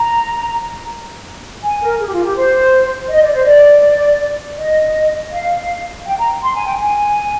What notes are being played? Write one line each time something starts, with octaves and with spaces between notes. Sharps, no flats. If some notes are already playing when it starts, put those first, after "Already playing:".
Already playing: A#5
G#5
A#4
G#4
G4
F4
G4
C5
D#5
D5
C5
D5
D#5
F5
G5
A#5
C6
G#5
G5
G#5